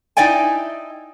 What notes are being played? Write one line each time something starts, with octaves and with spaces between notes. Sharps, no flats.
D#4 E4 D5 D#5 G5 G#5